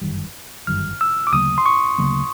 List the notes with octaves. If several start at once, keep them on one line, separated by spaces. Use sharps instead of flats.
G1 F#2 D#3 G3
G1 F#2 D#3 G3 F6
E6
D6
D2 C#3 F#3 A#3 D#6
C6
C#6
D2 C#3 F#3 A#3